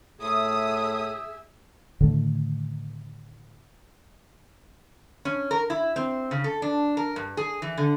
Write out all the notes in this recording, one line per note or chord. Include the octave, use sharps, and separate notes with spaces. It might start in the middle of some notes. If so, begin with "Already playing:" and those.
A2 G#4 E5 D#6
A2 D3 D#3 A3
C#4
A#4
E4
C4
C#3
A4
D4
A#4
G2
G#4
E3
D3